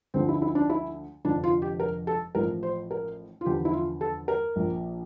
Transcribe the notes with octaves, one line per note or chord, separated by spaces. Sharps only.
D2 D3 F3 C4
E4
E4
D4
E4
F1 F2 D3 F3 D4
F4
G4
A#4
A4
A1 A2 F3 A#4
C5
A#4
F4
E2 D3 F3 G4
E4
F4
A4
A#4
A#1 A#2 F3